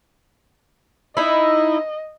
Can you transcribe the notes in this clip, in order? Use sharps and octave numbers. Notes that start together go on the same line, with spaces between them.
D#4 E4 D#5